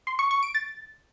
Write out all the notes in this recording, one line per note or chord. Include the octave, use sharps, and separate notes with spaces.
C6
C#6
C#6
D7
A6